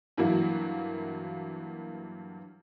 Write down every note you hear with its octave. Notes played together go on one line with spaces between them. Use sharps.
G2 E3 F#3 A#3 E4